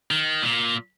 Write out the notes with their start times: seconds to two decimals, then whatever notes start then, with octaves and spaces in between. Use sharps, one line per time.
0.11 D#3
0.43 A#2